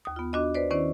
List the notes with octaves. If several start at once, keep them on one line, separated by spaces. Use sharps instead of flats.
D#2 D#6
B3 F4
D4 F#4 D#5
B4 C5 D5
D#3 C#4 E4 C5 D5